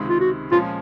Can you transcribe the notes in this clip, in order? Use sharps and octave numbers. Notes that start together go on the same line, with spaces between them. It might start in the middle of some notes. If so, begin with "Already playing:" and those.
Already playing: C#2 C3 D#3 G#3
F4
F#4
A#2 F3 G#3 C#4 F4